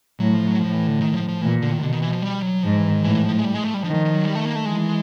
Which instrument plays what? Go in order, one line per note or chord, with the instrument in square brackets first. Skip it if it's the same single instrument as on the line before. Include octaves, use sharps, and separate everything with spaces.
[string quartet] A2 [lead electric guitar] F#3
[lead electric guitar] F3
F#3
[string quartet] A2 [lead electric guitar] F3
[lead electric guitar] E3
D3
D#3
F3
F3
[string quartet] A#2 [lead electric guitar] E3
[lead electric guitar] D3
D#3
[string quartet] B2 [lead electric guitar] D3
[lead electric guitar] D#3
E3
F3
G3
F#3
[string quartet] G#2 [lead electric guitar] F3
[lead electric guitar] E3
D#3
[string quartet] A2 [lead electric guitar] E3
[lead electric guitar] F3
G#3
G3
G#3
A3
G3
[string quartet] D#3 [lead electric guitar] F3
[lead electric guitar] F3
F3
F#3
G3
A3
A#3
A3
[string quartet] E3 [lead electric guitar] G#3